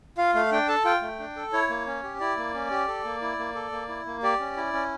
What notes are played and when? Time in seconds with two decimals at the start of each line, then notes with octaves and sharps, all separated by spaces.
0.18 F4 F5
0.35 A3 F5
0.52 D4 G5
0.68 A4 A5
0.85 F4 G5
1.02 A3
1.19 D4
1.36 A4
1.53 E4 C#5
1.70 A#3
1.87 C#4
2.03 G4
2.20 E4 D5
2.37 A#3
2.54 C#4
2.71 G4
2.88 A4
3.05 A#3
3.22 E4
3.39 A#3
3.55 A4
3.72 A#3
3.89 E4
4.06 A#3
4.23 G4 D5
4.40 C#4
4.57 E4
4.73 C#4